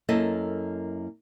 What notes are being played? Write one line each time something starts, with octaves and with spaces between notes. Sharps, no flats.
F#2 A#3 E4 A4 D#5